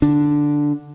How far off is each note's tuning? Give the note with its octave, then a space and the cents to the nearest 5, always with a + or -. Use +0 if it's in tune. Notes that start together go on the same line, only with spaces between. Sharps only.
D3 +0 D4 +0